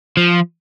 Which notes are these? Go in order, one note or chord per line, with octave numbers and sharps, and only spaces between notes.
F3